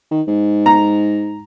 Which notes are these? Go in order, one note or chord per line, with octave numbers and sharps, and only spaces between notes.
D#3
G#2
A#5